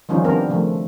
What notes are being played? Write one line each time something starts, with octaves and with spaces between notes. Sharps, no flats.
D#3 F3 G3 C#4 F4
D#3 G3 B3 C4 D4 A#4
C#3 F3 A3